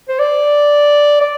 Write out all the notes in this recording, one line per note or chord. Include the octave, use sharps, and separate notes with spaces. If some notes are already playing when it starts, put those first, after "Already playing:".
C5
D5
D5